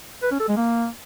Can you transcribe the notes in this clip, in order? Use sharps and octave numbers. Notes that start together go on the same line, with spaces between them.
B4
C#4
A4
G#3
A#3